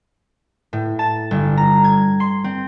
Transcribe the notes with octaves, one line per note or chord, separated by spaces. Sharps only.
A2
A5
G1
A#5
G#6
C6
C4